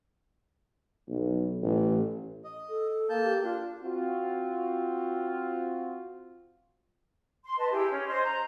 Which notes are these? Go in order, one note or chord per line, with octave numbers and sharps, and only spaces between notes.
B1
A1
D#5
A4
A#3 A5 G6
G4
D4 F4
C4 F4 F#4
C6
B4 D#5 A5
E4 G4 G#4
C#4
C5 D#5 C6
A#5